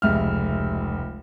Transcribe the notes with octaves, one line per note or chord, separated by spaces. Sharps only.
F1 C#2 E5 F6